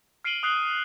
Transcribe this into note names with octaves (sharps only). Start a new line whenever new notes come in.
F6 C7 D7 D#7 F#7 G7
D#6 F#6 C7 F#7 G7